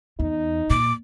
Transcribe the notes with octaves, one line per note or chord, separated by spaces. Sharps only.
E2 D#4
A#2 D6